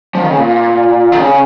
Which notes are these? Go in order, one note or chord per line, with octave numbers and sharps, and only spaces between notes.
F3
D#3
C#3
A#2
D#3
C#3